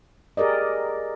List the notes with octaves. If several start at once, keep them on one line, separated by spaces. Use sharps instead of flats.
G4 G#4 A#4 D5 D#5